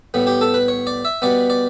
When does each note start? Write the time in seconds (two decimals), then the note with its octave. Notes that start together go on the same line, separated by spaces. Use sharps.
0.14 A2 G3 B3
0.27 G4
0.41 A4
0.54 B4
0.68 C#5
0.87 D5
1.05 E5
1.22 B2 G3 B3 D5
1.50 D5